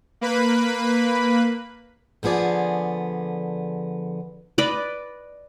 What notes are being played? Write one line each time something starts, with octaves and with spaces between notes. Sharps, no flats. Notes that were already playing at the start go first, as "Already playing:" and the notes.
A#3 B4 B5
D3 F3 B3 G#4 D5
B4 D5 D#5 B5